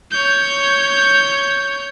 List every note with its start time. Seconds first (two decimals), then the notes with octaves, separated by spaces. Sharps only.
0.11 C#5 G6